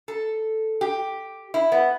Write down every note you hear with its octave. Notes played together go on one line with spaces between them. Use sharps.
A4
G4
E4
B3